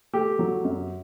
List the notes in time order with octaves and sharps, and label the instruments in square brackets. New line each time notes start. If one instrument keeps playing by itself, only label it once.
[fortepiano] A3 G4
F#3
F#2